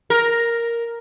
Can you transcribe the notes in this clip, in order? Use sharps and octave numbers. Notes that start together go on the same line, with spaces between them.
A#4